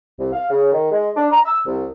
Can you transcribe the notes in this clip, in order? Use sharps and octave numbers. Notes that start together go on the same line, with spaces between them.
C2
F5
C#3
D#3
G#3
D4
A#5
E6
C2